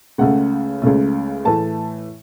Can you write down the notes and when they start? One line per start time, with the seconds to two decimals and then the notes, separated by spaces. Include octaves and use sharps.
0.18 C#2 C#3 A3 F#5
0.82 C#2 C#3 A3
1.45 A2 E3 A3 A5